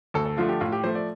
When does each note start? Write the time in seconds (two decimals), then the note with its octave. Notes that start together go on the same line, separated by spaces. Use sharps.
0.14 D2 A4
0.26 A4
0.37 D3 F3 A3 F4
0.49 G4
0.61 A2 F4
0.72 G4
0.84 F3 A3 C5
0.95 D5